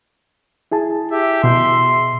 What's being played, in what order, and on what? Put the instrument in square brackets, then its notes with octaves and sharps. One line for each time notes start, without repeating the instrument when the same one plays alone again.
[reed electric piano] E4 G#4 A5
[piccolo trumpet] G4 [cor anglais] E5
[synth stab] B2 [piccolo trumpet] C6